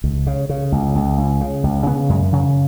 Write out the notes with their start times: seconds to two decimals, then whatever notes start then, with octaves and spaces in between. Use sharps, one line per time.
0.04 C#2
0.27 C#3
0.49 C#3
0.72 C#2
0.95 C#2
1.18 C#2
1.41 C#3
1.64 C#2
1.86 C#3 B3
2.09 F#2 G#3
2.33 C#3 F#3